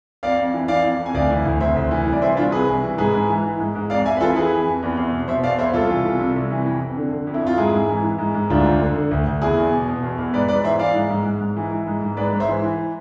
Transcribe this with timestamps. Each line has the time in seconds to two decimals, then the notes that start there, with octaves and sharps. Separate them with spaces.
0.23 F2 D5 F5
0.39 F2
0.54 E3
0.68 E3 D5 F5
0.84 F2
0.99 F2
1.06 G#5
1.14 D2 D5 F5
1.30 E3
1.45 D2
1.60 C3 C5 E5
1.76 D2
1.91 E3
2.06 C2
2.12 D5
2.22 E3 C5 E5
2.36 C2 D4 F4
2.52 C3 G#4 B4
2.68 C2
2.83 E3
2.98 G#2 G#4 B4
3.14 G#2
3.29 E3
3.44 E3
3.59 G#2
3.75 G#2
3.90 F2 D5 F5
4.06 F2 E5 G#5
4.17 B4
4.20 E3 F4 A4
4.36 E3 G#4 B4
4.52 F2
4.67 F2
4.83 E2
4.97 E2
5.13 B2
5.28 B2 C5 E5
5.43 E2 D5 F5
5.58 E2 C5 E5
5.73 C2 F4 A4
5.89 E3
6.05 C2
6.20 C3
6.36 C2
6.51 E3
6.66 F2
6.81 F2
6.96 D3
7.12 D3
7.27 F2
7.34 E4
7.42 F2 F4
7.58 G#2 E4 G#4
7.73 G#2
7.89 E3
8.04 E3
8.18 G#2
8.34 G#2
8.50 D2 D4 F4
8.66 D2
8.80 D3
8.96 D3
9.11 D2
9.27 D2
9.41 E2 E4 G#4
9.57 E2
9.72 B2
9.88 B2
10.03 E2
10.18 E2
10.33 G#2 B4 D5
10.48 G#2 B4 D5
10.64 E3 C5 E5
10.79 E3 D5 F5
10.95 G#2
11.10 G#2
11.25 G#2
11.41 G#2
11.56 E3
11.72 E3
11.87 G#2
12.02 G#2
12.17 G#2 B4 D5
12.33 G#2
12.40 C5 E5
12.48 E3
12.64 E3